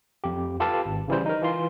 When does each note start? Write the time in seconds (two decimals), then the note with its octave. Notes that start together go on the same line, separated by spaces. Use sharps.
0.24 F2 G4
0.60 F4 G4 A4 B4 F5 A5
0.86 G#1
1.08 C#3 E3 G3 C5
1.26 D#4 A#4
1.42 E3 F4 C6